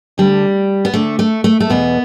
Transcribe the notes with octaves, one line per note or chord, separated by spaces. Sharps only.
D2 D3 G3
B3
D2 D3 A3
A3
A3
A3
E2 B2 B3